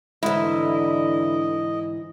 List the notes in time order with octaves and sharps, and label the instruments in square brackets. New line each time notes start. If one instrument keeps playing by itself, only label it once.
[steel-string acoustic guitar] G#2 E3 [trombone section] D3 [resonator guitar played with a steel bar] E4 [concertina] D#5